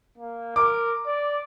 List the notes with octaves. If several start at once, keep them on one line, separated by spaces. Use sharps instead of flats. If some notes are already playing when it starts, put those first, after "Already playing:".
A#3
A#4 D6
D5